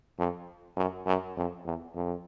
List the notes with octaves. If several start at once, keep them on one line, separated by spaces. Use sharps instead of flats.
F2
F#2
F#2
F2
E2
F2